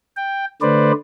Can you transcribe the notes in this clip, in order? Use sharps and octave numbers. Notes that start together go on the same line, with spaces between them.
G5
D3 A3 B4 C5 D5